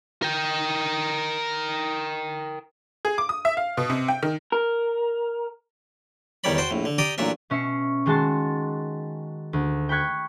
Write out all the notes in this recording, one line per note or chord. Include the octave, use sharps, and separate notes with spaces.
A#4 G5
G#4
D6
D#6
E5
F5
B2
C3
G5
D#3
A#4
E2 D#3 G3 C#5 D5 B5
F#4 C5 G5 A5
A#1 A2
D3
G4 D5 G5 A#5 D6 D#6
A1 A#2 F#3 D4 E5
B2 C#4 E5 C#6 C7
D#3 G#3 F#4 A5 C6 A6
D2
G5 B5 C#6 F#6 G#6